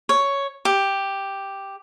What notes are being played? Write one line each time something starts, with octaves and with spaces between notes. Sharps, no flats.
C#5
G4